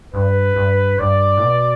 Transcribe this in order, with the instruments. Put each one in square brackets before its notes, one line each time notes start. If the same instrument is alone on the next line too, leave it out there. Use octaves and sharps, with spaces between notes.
[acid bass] G2 [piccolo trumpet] B4
[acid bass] G2
[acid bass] G2 [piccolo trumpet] D5
[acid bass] A2
B2